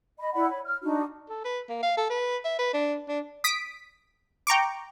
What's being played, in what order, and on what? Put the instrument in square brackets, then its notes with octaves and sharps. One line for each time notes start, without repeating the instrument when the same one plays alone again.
[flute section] D#5 B5
E4 D5 F#5 B5
C#5 B5
F6
D4 D#4 F#4
[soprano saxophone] A4
B4
A#3
F5
A4
B4
E5
B4
D4
D4
[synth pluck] D#6 B6 D7
G5 A#5 C#6 D6